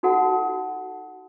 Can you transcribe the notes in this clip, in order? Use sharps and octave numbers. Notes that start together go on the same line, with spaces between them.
D#4 F#4 A4 F#5 A5